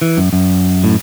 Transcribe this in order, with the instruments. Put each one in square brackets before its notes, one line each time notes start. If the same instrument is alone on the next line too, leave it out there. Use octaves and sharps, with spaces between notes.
[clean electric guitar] E3
F#2
F#2
A2